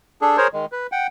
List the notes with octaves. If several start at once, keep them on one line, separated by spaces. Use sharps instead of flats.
D4 G#4 A4
G#4 A#4 C5 C#5
D#3 G#3
B4
F#5 G5